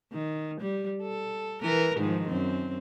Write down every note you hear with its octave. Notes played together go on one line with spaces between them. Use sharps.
D#3
G3
A4
E3 A#4 B4
G#2 D#3 F3
F#2 C4